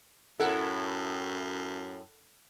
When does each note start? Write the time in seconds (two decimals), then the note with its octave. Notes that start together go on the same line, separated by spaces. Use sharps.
0.40 F#2 A2 E4 A4 A#4 F#5